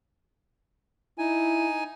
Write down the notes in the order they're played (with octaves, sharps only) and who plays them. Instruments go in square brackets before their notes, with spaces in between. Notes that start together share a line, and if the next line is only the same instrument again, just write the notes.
[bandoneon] D#4 G#5 [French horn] E4